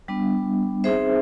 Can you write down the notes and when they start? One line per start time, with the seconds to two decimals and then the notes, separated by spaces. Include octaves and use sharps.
0.08 G3 B3 D4
0.84 C4 D#4 G#4 C5 E5